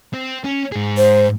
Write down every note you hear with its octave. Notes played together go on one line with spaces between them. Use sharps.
C4
C#4
G#2 G#4
C5